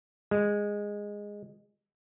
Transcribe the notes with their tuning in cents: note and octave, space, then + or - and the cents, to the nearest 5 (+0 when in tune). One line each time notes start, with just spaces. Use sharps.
G#3 -10